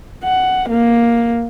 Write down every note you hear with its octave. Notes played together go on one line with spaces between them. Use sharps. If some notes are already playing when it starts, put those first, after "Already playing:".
F#5
A#3